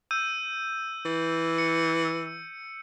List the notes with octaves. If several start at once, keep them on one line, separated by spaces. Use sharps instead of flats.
E6 G6 D#7
E3
C#7